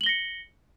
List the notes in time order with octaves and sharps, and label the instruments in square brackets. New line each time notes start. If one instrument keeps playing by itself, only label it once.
[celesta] F#7
G7
A#6
C#7